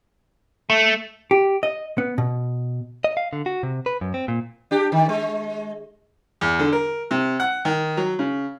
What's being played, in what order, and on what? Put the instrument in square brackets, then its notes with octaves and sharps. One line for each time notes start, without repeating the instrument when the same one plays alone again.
[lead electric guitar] A3
[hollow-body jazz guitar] G4
D#5
B3
B2
[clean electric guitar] D#5
F5
D3
F#4
C3
B4
F#2
C4
A#2
[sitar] D4 G4
D#3
G#3
[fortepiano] E2
D3
A#4
C3
F#5
D#3
F#3
C#3